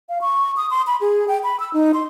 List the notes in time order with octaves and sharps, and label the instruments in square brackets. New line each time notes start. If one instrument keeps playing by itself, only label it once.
[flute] F5
C#6
D#6
C6
B5
G#4
G5
B5
E6
D#4
C6